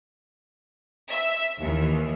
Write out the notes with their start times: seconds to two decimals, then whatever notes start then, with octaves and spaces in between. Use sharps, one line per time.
1.10 E5
1.61 D#2 E3